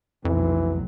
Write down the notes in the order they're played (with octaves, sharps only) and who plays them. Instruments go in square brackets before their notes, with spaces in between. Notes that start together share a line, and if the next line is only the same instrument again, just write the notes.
[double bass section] F1 B1 F#3 [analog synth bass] F2 [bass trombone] E3